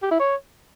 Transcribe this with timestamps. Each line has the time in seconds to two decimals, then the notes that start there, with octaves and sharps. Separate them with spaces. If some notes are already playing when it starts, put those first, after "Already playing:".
0.02 G4
0.11 E4
0.20 C#5